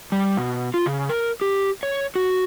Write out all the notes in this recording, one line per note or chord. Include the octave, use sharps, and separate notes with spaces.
G3
B2
F4
C#3
A#4
G4
C#5
F#4